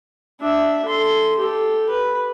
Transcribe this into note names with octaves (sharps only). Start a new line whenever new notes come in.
D4 E5
A4 C6
G4 A4
B4